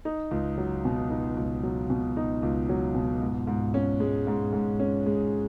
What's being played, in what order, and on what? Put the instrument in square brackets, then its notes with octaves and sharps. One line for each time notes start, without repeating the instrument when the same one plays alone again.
[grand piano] D#4
C#2
F#3
B2
D#4
C#2
F#3
B2
D#4
C#2
F#3
B2
G#2
G#2
C#4
G#3
G#2
G#2
C#4
G#3